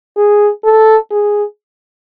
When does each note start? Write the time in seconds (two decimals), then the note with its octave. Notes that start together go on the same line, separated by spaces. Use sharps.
0.17 G#4
0.64 A4
1.11 G#4